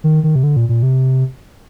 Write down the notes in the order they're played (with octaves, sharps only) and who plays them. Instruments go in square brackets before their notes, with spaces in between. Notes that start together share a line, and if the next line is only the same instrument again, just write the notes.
[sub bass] D#3
D#3
C3
D3
A#2
A#2
C3